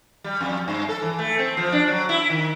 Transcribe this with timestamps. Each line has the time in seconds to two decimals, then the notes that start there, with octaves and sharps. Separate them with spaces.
0.24 G3
0.41 F2
0.68 G2
0.89 A4
1.02 E3
1.19 A3
1.39 C4
1.57 F3
1.72 D4
1.88 F#3
2.09 E4
2.30 D#3